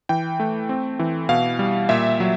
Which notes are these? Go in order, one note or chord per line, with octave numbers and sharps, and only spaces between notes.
E3 G5
A3
C4
E3
B2 F5
G3
A#2 E5
F#3